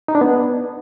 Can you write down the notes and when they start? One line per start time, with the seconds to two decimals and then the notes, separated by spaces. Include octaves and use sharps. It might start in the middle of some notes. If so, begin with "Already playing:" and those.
0.08 D#4
0.15 D4
0.21 B3